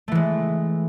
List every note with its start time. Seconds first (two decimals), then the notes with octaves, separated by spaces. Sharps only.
0.08 A3
0.12 E3
0.15 G#3